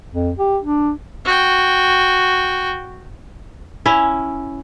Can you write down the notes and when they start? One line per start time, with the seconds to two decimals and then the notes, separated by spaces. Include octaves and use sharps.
0.12 F2
0.38 G4
0.64 D4
1.25 F#4 G5
3.86 C#4 E4